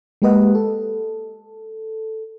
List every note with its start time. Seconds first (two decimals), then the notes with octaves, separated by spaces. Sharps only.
0.22 G#3 A#3 G4 B4 D#5 F#5
0.55 A4